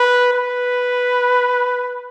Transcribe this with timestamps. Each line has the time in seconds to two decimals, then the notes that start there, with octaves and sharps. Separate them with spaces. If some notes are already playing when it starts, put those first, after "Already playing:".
Already playing: B4
0.34 B4